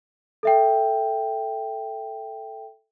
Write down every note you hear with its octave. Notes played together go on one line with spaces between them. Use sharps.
A4 E5 G5